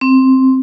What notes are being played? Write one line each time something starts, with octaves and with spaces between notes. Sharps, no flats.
C4